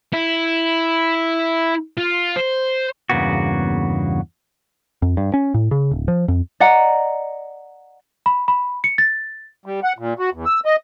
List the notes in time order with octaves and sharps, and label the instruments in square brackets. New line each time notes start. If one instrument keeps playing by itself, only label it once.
[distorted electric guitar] E4
F4
C5
[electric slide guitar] E2 G2 C#3 A#3 B3 F#4
[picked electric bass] F2
G2
C#4
A2
C#3
D1
F3
F2
[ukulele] D5 D#5 F#5 A#5
[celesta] B5
B5
C#7
A6
[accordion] G3
F#5
A#2
F#4
E2
E6
D#5